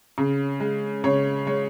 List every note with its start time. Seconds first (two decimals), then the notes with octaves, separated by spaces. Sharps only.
0.18 C#3
0.60 G#3
1.04 C#3 C#5
1.47 G#3 C#5